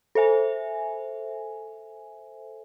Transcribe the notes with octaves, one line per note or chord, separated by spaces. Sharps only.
A4 C5 E5 G#5